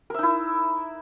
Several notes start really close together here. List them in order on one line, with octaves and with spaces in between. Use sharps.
A#4 E5 D#4 E4